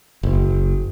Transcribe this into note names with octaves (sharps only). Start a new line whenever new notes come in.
F#1